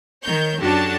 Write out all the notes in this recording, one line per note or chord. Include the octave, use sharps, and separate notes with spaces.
D#3 A#4 C#5 G6
F#2 D4 F#4 G4 A4 A5